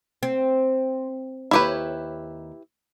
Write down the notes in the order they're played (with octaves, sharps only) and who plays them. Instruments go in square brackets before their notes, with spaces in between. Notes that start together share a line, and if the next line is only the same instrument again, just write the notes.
[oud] C4
[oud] D#2 C#5 [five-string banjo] E4 G4 B4